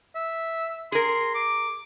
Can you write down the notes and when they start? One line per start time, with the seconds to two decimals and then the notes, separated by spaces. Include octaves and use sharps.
0.16 E5
0.92 G#4 A#4 C6
1.35 D6